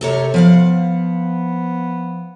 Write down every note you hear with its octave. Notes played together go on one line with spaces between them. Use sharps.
C3 A4 A#4 C#5
F3 B3 F5 F#5